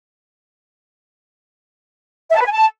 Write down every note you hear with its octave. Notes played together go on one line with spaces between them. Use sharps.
E5
A5
B4
G#5
A5